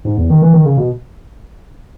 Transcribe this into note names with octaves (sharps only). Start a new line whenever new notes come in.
G#2
E2
D#3
E3
D#3
C#3
B2